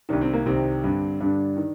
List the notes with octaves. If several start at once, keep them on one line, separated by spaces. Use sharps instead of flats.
C2 C3 D#3 D4
C4
A#3
C2 C3 D#3 C4
G2 D3
G2 D3 D4
D#3